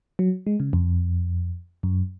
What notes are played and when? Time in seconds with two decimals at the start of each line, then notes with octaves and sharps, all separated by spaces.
0.19 F#3
0.47 G#3
0.60 C#3
0.73 F2
1.83 F#2